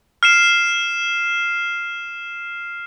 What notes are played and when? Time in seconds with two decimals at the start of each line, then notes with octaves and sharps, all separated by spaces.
0.23 F6 C7 E7